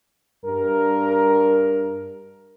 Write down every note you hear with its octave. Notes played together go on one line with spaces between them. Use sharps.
G2 A#4